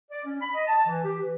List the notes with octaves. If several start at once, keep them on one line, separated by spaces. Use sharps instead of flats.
D5
C#4
B5
D#5
A5
E3
G4
E3